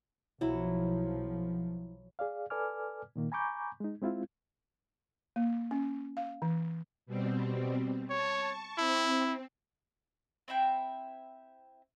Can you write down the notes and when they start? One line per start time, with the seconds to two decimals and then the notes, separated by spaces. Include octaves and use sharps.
0.41 B1 F3 F#3 E4
2.19 G#4 D5 F5
2.50 A4 B4 D5 G#5 D6 F6
3.16 A#2 D#3 A#3
3.32 G#5 A#5 B5 C#6 D6 G6
3.80 G#3 D#4
4.01 G#3 C4 E4 F4
5.36 A#3
5.71 C#4
6.17 F5
6.42 E3
7.06 B2 G3 C4
8.10 C#5 A5 C#6
8.78 C4 E4
10.48 C4 E4 E5 G5